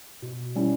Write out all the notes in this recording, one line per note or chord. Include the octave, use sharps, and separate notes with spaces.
B2
G3 C#4 E4